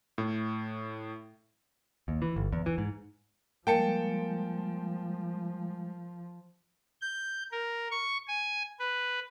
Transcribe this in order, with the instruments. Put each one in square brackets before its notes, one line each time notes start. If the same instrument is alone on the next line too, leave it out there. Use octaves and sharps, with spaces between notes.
[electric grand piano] A2
[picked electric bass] D#2
E3
G1
E2
E3
G#2
[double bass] F3 [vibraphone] G3 G#3 [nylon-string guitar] A#3 [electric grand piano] G5 A5 C#7
[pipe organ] G6
A#4
C#6
G#5
B4